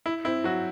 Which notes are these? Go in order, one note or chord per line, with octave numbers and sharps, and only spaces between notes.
E4
C4 E4
F#3 F#4